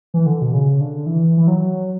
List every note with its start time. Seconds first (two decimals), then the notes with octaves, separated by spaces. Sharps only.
0.14 E3
0.26 D3
0.42 B2
0.53 C#3
0.81 D3
1.06 E3
1.37 E3
1.47 F#3